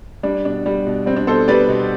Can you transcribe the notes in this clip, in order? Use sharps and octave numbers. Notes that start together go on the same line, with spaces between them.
G3 D4
B2 D4
G3
B2
G3 C4
D4
B2 A4 C5
G3 B4 D5
B2